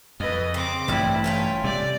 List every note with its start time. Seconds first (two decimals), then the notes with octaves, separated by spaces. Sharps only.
0.20 F2 B4 D#5
0.54 C#3 C4 D6
0.88 A1 G2 A#2 G3 E4
1.24 A3 C#4 F4 G5
1.64 C3 G3 D5